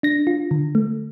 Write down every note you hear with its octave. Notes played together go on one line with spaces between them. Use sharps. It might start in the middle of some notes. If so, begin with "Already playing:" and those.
D4 A#6
F4
D3
A3